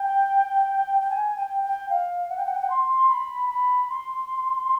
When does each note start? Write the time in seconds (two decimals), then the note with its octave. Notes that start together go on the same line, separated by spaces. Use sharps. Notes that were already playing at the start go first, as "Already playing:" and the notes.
Already playing: G5
1.01 G5
1.10 G#5
1.37 G5
1.64 G5
1.89 F5
2.29 F#5
2.37 G5
2.46 F#5
2.53 G5
2.61 F#5
2.70 C6
3.09 B5
3.49 B5
3.90 C6